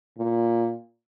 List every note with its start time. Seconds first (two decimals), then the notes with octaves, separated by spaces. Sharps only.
0.18 A#2